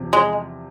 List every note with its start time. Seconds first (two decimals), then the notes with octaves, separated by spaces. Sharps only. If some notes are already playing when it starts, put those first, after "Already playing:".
Already playing: E2 C3 F3
0.13 G#3